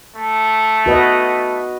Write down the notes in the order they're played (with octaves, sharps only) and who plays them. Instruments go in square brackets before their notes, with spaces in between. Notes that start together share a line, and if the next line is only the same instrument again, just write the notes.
[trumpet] A3
[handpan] F#4 B4 D#5